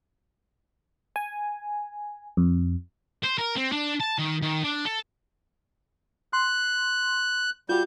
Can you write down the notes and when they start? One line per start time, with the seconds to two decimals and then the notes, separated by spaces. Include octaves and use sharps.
1.16 G#5
2.37 F2
3.24 C5
3.38 A#4
3.56 C4
3.72 D4
4.00 A5
4.18 D#3
4.42 D#3
4.64 D4
4.85 A4
6.33 C6 F#6
7.69 G3 F4 F#4 G6